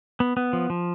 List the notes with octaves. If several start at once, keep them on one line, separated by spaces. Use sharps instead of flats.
B3
B3
F3
F3